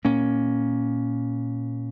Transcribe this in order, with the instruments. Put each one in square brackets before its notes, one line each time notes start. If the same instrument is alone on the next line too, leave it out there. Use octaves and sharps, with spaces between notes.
[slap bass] A#2 A#3 C#4